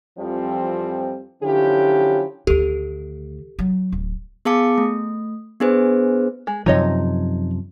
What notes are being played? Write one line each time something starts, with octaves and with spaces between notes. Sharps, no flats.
F2 E3 F3 G3 C4
D3 F3 F#3 C#4 E4 G4
D2 D#3 G4 A4
F#3
D1
B3 G#4 F5 A5 D6 C#7
A3
B3 D4 G#4 B4 C5
G#3
F#2 C3 F3 D#4 C#5 D#5